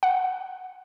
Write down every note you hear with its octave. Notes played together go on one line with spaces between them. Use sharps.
F#5